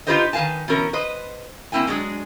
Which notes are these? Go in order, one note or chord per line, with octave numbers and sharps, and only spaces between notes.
D#4 F4 G4 B4 C5 D#5
D#3 B4 F5 G#5 A5
B2 E3 C#4 A#4
B4 C5 D#5
A#3 C4 E4 G5 G#5
F#3 G#3 D4 G#4